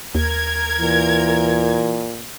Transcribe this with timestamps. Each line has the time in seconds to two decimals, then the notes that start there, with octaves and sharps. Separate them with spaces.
0.15 D#2 A#4 G#6
0.80 A#2 E3